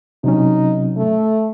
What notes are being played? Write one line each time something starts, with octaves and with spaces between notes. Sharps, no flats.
C3 F#3 C#4 D#4
A3